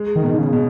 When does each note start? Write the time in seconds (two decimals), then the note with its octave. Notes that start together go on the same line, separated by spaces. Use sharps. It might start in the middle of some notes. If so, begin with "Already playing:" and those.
Already playing: G#3
0.16 D#3
0.23 B2
0.34 D#3
0.39 C#3
0.53 B2